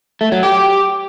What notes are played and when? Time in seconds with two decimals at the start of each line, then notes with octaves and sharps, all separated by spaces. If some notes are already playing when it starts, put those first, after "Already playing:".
0.21 A3
0.32 F#3
0.43 G4